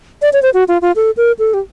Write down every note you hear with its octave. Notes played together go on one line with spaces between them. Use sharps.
D5
C#5
C5
F#4
F4
F4
A4
A#4
A4
G4